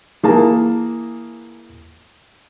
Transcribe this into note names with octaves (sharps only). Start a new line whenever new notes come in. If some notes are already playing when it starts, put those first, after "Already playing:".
E3 A#3 G#4 A5